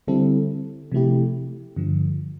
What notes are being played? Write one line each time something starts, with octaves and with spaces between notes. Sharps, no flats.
D3 G3 C4 E4 A4
C3 F3 A3 E4 G4
G2 D3 F3